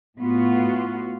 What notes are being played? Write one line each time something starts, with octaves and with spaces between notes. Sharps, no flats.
A2 B3 F4 F#4